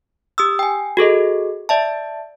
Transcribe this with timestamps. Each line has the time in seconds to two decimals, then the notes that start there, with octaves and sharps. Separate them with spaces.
0.38 G4 D#6 E6
0.59 G5 G#5
0.97 F#4 G#4 A4 D#5
1.69 D5 E5 A5